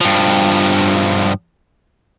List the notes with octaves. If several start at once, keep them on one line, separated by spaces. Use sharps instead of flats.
G2 F3